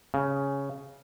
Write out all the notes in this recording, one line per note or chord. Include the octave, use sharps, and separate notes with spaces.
C#3